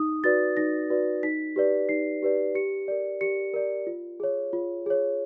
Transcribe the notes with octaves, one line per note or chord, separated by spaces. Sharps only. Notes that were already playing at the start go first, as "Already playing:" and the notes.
Already playing: D#4 D#6
F#4 B4 D5 A6
D#4 A#6
F#4 B4 D5
D#4 B6
G4 B4 D5
D#4 C7
G4 B4 D5
G4 C#7
A#4 D5
G4 C#7
A#4 D5
F4
G#4 C#5
F4
G#4 C#5